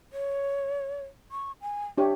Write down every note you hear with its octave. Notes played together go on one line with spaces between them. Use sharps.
C#5
C#6
G#5
D4 G4 C#5 E5